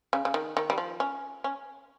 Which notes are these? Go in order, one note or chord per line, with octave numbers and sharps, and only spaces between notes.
C#3
C#3
D#3
D#3
G3
F3
C#4
C#4